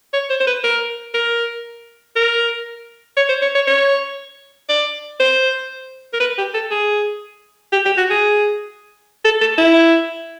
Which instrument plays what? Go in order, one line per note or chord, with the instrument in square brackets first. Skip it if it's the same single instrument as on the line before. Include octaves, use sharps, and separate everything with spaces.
[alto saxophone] C#5
C5
C5
B4
A#4
A#4
A#4
C#5
C5
C#5
C#5
C#5
D5
C5
A#4
B4
G4
A4
G#4
G4
G4
F#4
G#4
A4
A4
E4